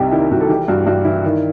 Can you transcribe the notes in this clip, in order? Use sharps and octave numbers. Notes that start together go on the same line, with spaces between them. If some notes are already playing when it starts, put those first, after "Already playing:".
Already playing: C2 C3 D#4 G4
D#3 E4
C2 F#4
A4
E3 G4
G2 F#4
G2 F#4
E3 E4
D#3